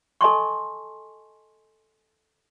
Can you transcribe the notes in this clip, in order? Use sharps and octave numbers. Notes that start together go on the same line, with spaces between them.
A4 D#5 G#5 A5 C6 C#6